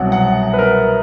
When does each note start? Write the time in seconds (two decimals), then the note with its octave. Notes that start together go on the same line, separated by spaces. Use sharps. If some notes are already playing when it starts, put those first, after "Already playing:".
Already playing: C2 B2 F#3 F#5
0.12 F#5
0.54 B4
0.59 A#4